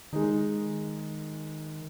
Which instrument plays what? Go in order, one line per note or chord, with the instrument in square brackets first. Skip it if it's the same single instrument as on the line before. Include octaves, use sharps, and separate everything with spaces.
[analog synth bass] D#3 [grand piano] G#3 D#4